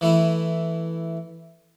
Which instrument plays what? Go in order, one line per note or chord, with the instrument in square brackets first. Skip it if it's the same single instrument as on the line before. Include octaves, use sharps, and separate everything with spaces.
[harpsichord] E3 A3 E4